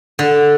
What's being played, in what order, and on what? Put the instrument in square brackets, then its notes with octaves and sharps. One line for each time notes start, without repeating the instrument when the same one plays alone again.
[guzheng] D3